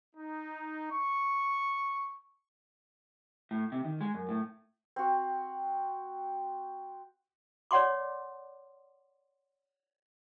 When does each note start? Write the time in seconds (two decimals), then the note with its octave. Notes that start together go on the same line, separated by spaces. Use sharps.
0.16 D#4
0.92 C#6
3.51 A2
3.72 C3
3.85 D#3
4.01 G#3
4.14 F#2
4.29 A2
4.96 C4 F#4
7.71 C#5 D5 F#5 C6 D6